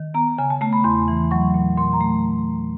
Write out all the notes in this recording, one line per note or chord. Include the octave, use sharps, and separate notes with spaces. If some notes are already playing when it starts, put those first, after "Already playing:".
Already playing: D#3
B3 A#5
C#3 G#5
A5
A3 A5
B5
E2 C6
E3
F#3 C#6
A#2
A#2 C6
A#5
A3